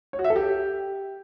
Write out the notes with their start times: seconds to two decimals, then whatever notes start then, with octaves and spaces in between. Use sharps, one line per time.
0.13 C#5
0.19 F#4
0.24 E5
0.30 A4
0.36 G4